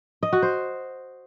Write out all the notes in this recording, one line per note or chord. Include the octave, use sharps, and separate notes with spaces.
D#5
F#4
C5